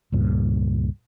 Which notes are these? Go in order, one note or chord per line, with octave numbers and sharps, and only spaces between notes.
C#2 G2 A#2